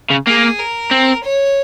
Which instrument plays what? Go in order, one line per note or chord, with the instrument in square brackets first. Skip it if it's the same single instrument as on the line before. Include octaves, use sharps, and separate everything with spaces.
[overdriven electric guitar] C#3
[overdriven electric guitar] A#3 [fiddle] G#4
[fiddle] A#4
[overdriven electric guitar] C4
[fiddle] C#5